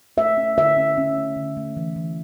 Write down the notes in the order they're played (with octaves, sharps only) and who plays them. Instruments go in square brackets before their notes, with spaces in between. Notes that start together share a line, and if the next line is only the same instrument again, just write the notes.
[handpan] A3 E5
C#4
D3 E5
C#4
C#4
A3
D3
A3
E3
E3